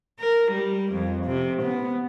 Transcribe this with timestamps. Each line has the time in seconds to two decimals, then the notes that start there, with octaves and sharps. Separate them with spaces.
0.20 A#4
0.52 G3
0.93 F2
1.26 C3
1.63 B3